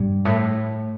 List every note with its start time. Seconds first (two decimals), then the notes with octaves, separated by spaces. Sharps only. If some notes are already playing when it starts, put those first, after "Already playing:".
Already playing: G2
0.25 A2